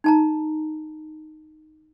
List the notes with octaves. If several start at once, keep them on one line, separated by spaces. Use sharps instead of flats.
D#4 A5 A#5